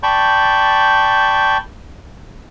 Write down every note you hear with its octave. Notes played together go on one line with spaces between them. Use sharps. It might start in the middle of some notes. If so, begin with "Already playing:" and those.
D5 G5 A5 B5 C#6 G6